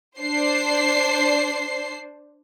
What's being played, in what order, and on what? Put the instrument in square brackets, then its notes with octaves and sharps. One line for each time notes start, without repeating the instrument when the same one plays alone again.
[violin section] D4 C5 C7